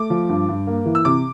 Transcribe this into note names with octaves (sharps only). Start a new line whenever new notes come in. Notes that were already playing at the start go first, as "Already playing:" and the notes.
Already playing: A3 D6
F3
G2
G2
A#3
E3
E6
C3 D6